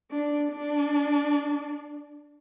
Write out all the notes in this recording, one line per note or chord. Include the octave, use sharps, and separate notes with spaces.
D4
D4